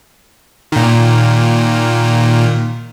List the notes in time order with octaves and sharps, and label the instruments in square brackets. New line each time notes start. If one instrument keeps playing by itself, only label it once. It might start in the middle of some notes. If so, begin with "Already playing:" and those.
[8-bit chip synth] A#2 D#3